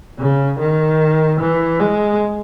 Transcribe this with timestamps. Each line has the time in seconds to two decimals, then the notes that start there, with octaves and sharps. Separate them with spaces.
0.19 C#3
0.59 D#3
1.40 E3
1.80 G#3